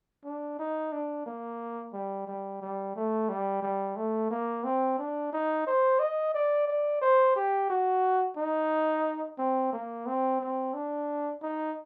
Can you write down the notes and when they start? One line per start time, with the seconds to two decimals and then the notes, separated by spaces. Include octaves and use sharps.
0.24 D4
0.59 D#4
0.92 D4
1.26 A#3
1.93 G3
2.27 G3
2.62 G3
2.96 A3
3.29 G3
3.62 G3
3.96 A3
4.31 A#3
4.64 C4
4.98 D4
5.33 D#4
5.67 C5
5.99 D#5
6.34 D5
6.68 D5
7.01 C5
7.36 G4
7.70 F#4
8.37 D#4
9.38 C4
9.73 A#3
10.06 C4
10.40 C4
10.74 D4
11.42 D#4